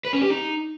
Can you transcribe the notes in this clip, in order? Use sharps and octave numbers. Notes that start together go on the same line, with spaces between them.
B4
C#4
G4
D#4